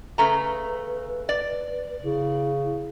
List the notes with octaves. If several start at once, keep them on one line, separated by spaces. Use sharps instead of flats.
C#3 A3 B4 A#5
D5
C#3 E4